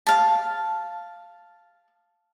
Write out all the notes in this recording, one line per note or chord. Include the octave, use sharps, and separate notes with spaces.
F5 A5